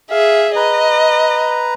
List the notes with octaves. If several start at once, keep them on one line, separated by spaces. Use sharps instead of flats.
G#4 E5 F5
B4 D#5 A#5